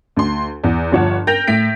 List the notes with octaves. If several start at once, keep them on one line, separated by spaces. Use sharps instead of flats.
D2 C6
E2
G1 F3 C#5 F#5 A5
A#4 G5 G6 A#6 F7
A2 B6 D7